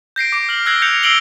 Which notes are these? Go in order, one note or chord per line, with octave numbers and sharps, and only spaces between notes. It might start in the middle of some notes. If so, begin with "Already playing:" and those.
G6 A#6 C7 D7
D6 D7
F6 F#7
E6 F#6 G#6 A#6 C7 F#7
F#6 G6 A#6 C#7 D7 F7
E6 A#6 C7 D7 F#7 G7